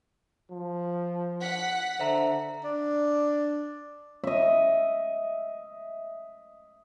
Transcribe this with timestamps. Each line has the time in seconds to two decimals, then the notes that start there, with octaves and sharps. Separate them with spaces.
0.51 F3
1.41 F#5 B6
2.00 D3 C5 E5 A#5
2.64 D4
4.24 D#5 E5